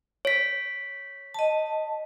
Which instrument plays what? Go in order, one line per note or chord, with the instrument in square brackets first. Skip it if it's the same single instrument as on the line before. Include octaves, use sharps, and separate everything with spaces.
[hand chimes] C#5 B6
[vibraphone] D#5 A5